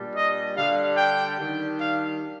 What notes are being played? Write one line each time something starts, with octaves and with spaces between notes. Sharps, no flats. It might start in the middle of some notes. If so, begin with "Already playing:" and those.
Already playing: A#2 G3 D4
D#5
D3 G3 D4 F5
G5
D#3 G3 D4
F5